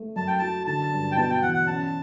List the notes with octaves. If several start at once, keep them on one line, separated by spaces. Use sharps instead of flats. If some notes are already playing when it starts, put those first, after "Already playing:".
Already playing: A3
F#2 A5
G5
F#3 A5
D3 A5
G2
G5
B2 A5
G5
E2 F#5
F#5
C#4 A5